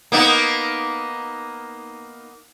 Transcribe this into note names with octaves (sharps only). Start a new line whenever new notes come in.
A#3 B3 D#4